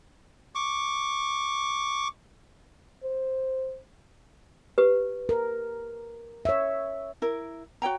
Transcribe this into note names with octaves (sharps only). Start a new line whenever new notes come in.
C#6 D6
C5
G4 B4
A#4
C#5 E5
E4 A#4
F#4 C#5 G5 A#5